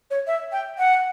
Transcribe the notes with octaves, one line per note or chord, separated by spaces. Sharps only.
C#5
E5
G5
F#5